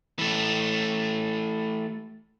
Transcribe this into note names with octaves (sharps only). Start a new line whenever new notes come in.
E3 A3